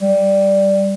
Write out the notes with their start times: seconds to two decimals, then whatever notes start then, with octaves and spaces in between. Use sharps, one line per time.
0.02 G3